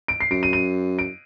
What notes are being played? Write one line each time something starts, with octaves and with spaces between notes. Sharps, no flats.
D7
C7
F#2 D7
D#7
D#7
D7